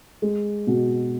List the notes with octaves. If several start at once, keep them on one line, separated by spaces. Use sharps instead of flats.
G#3
B2